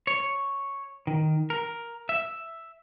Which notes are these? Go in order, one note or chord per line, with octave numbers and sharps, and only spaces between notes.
C#5
D#3
A#4
E5